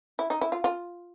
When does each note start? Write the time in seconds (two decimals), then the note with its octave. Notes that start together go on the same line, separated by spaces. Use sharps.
0.19 E4
0.30 D#4
0.41 E4
0.52 F4
0.64 F4